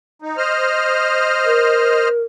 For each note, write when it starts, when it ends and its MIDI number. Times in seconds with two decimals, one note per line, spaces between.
0.22 0.37 63
0.37 2.09 72
0.37 2.09 75
0.37 2.09 89
1.46 2.22 70